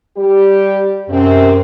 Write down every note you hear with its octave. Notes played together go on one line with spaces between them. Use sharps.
G3 G4
F#2 C3 C4